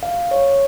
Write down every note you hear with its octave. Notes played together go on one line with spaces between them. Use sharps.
F5
C#5